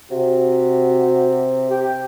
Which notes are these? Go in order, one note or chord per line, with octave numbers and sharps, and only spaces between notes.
C3 F#4
G4